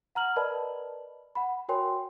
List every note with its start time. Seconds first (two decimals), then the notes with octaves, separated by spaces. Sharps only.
0.15 F#5 A#5 F6 F#7
0.36 A#4 B4 D5 D#5 A5 B5
1.35 F#5 B5
1.69 F#4 A#4 C#5 G5 G#5 C6